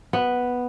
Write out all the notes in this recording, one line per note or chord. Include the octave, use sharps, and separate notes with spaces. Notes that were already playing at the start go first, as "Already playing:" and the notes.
B3